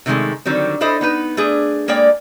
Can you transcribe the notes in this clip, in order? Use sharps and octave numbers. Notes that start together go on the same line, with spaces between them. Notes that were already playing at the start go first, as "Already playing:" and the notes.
C3 D#3 F3 G#3 A3
D3 D#3 F#3 G3 C4
D4 E4 A4 C5 D#5
B3 D#4 B4
A3 D4 G#4
G#3 A#3 C#5 D5 G5